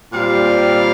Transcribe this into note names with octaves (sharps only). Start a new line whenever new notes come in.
A#2 G3 C4 F5